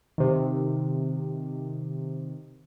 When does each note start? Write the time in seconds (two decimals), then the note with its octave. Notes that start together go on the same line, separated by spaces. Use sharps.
0.18 C3 D#3